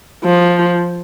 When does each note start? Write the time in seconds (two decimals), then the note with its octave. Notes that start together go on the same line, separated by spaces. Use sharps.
0.25 F3